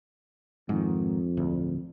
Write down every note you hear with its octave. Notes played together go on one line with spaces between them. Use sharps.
F2 G#2 D#3
D1 D2